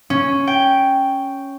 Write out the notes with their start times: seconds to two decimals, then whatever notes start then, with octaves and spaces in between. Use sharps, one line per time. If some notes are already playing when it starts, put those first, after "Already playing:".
0.10 C#4
0.47 G5